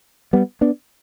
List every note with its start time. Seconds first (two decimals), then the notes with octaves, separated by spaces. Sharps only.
0.33 G3 B3
0.61 B3 D4